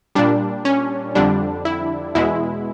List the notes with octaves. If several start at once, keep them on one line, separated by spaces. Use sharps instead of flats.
A#2 G3 D4
C#4
F2 D3 G3 D4
E4
E2 B2 G#3 E4